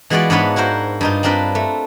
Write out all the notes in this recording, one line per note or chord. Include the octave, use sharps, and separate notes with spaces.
E3 G#3 B3 F4 F#4 D5
G#2 B3 D4 F4 B4 C#5
E4 F#4 A#4 C5
G2 D#4 F4
C4 D4 F4 A#4 B4
A3